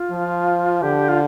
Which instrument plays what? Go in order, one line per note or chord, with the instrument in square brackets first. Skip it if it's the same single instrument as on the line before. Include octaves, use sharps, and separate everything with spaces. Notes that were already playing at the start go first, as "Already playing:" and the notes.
Already playing: [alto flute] F4
[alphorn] F3
[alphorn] D3 [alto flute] G4
[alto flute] F4